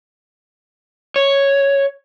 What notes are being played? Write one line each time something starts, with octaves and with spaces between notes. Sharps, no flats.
C#5